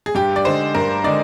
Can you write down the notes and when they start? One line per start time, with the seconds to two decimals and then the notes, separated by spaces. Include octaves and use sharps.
0.06 G#4
0.15 G2 G4
0.36 D5
0.45 D3 G#3 D#4 C5
0.74 G2 A#4
1.04 D3 G#3 D#4 D5